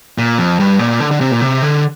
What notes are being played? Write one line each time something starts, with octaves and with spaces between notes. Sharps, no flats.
A#2
F2
G2
A#2
D3
D3
C3
A#2
C3
D3